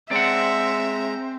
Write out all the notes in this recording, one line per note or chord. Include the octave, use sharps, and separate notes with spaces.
G#3 C4 D5 E5 F#5 A#5